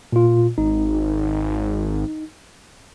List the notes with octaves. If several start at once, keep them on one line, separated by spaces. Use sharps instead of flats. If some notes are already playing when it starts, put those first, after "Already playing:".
A#2 F4
G#1 D#4